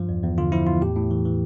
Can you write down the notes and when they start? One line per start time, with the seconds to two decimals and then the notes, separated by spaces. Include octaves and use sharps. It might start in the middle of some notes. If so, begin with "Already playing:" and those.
Already playing: G2 F3 F4
0.09 E2
0.23 E2
0.38 D3 F4
0.52 F3 E4
0.66 E2 F4
0.81 A2 G4
0.96 A2
1.11 E3
1.26 E3